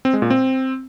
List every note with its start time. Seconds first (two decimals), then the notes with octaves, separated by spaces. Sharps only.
0.05 C4
0.13 G#3
0.22 A#2
0.30 C4